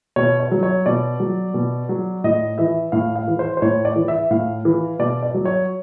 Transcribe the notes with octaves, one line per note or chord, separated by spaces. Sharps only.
B2 C#5
C#5
F#3
C#5
B2 D5
F#3
B2
F#3
A2 D#5
E3 E5
A2 F5
F5
E3
C5
C5
A2 C#5
D5
E3
E5
A2 F5
E3
B2 D5
D5
F#3
C#5